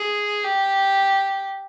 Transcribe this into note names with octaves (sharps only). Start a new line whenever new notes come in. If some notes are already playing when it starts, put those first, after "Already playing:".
Already playing: G#4
G4